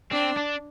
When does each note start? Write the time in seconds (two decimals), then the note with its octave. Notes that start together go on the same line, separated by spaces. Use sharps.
0.11 C4 D4
0.37 D4